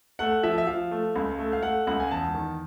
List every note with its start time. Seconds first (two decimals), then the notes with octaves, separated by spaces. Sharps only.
0.19 A3 F#5
0.43 F3 E5
0.58 E5
0.67 F3 F5
0.91 A3
1.16 C#2
1.39 A3
1.53 F5
1.63 A3 F#5
1.87 C#2 F#5
2.00 G#5
2.11 E2 A5
2.35 D#3